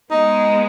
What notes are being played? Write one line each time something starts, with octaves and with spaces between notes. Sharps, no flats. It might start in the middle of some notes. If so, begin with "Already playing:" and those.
G#3 B3 D#4